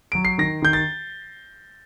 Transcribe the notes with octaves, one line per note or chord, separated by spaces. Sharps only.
F#3 D7
C7
D#3 A#6
D#3 G6
A6